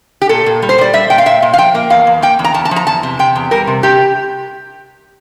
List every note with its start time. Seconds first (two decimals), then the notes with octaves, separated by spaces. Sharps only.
0.22 G4
0.29 A#2 A4
0.46 A#2
0.62 G3
0.69 C5
0.78 G3 D5
0.93 G3 E5
1.10 A#2 G5
1.18 F5
1.26 A#2 E5
1.42 A#2
1.54 F5
1.58 F3 G5
1.75 A#3
1.90 E2 F5
2.07 E2
2.22 A#3 G5
2.39 E2
2.44 A#5
2.54 E2 A5
2.65 A5
2.71 F3
2.76 A#5
2.87 E2 A5
3.03 C3
3.19 C3 G5
3.35 E2
3.51 G3 A#4
3.67 C3
3.83 C3 G4